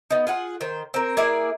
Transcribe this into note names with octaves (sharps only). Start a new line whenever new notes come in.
B3 D#4
F4 G#4 F#5
D#3 C5
C4 A#4
A#3 E4 G#4 D5